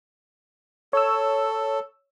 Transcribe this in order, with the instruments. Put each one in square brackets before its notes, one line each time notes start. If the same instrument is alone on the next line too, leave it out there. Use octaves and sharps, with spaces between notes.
[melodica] A4 [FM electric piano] C#5 E6